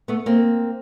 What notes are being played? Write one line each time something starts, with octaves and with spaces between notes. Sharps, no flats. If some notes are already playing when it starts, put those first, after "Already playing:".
A3 B3
A#3 C4